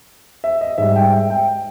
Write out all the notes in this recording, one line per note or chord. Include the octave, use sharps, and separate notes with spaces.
E5
D#5
G#2 G3 E5
G5
E5
G5